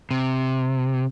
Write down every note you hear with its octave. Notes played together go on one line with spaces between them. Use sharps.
C3